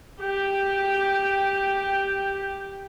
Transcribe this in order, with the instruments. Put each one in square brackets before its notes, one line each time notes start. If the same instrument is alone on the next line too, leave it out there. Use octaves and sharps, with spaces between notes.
[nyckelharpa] G4 [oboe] G5